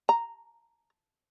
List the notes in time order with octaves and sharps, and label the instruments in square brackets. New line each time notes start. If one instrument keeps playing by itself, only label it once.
[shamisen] A#5